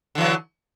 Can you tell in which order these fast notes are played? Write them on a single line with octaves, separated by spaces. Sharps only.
D3 E3 F#3